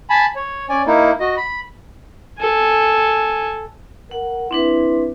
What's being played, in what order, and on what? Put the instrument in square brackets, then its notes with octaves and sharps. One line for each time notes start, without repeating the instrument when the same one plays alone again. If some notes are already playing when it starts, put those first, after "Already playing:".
[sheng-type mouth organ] G#5 A5 B5
C#5
C#4 D5 G#5
A#3 D#4 E4
F#4 D#5
B5
[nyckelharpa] A4 G#5
[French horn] A#4 [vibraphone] F#5
[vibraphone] C4 D4 B4 [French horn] E4